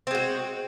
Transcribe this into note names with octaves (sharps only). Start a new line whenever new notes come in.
G#3 C4 F#4